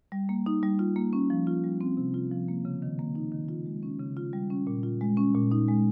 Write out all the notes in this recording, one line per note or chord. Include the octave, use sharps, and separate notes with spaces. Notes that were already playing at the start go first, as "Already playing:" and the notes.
G3
A#3
D#4
G3
F4
A#3
C#4
F3
F4
G3
C4
C3
F4
F3
A#3
C#3
D#3
A#3
D#4
D#3
F4
G#3
C#4
C#3
F4
G3
C#4
A#2
F4
G#3
C#4
A#2
D#4
G#3